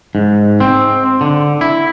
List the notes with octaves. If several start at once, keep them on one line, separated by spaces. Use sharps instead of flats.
G#2
C4
D3
E4